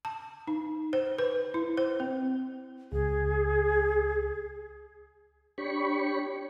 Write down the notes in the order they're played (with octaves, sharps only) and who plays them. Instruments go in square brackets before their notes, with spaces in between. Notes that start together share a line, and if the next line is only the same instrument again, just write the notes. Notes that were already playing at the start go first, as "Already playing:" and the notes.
[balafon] A5
D#4
C5
B4
E4
C5
C4
[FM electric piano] C#2 [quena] G#4
[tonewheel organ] D4 G4 C#5 B5 C#6